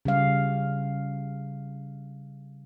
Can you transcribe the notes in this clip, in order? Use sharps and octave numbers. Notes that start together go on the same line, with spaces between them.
C#3 G3 F5